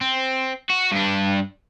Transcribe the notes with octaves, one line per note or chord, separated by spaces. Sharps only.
C4
F#4
G2 D4